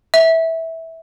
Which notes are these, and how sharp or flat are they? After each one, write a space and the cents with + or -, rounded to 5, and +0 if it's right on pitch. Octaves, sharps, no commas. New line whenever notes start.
E5 -15